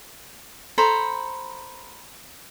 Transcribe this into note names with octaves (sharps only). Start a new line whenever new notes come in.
A4 C5 A#5 B5